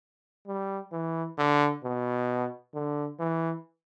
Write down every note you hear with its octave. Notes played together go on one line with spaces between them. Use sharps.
G3
E3
D3
B2
D3
E3